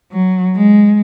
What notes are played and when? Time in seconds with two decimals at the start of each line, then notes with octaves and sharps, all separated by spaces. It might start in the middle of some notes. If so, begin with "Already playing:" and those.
0.12 F#3
0.55 G#3